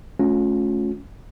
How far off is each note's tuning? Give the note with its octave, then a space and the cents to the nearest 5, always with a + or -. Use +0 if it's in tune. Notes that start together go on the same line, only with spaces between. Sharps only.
A3 -30 C#4 +0 F4 +40